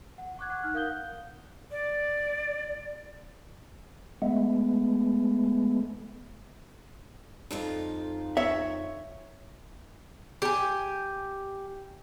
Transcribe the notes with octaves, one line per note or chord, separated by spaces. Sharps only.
F#5
F#5 C#6 D6 F#6 G#6
F#5
D#4 F6 F#6
A#4 F5 F#5 D#6 G6 G7
D5
G#3 A3 B3
F2 D#4 F4
C#5 E5
G4 G#5